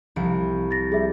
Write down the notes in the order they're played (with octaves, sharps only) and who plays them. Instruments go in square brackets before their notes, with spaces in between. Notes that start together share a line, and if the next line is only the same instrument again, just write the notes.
[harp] C2 F3 D7
[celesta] A6 A#6
[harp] G3 [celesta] G#4 E5